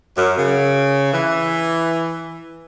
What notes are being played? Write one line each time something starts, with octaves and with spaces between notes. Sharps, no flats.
F#2
C#3
E3